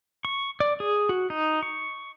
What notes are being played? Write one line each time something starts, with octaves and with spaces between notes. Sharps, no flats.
C#6
D5
G#4
F#4
D#4
C#6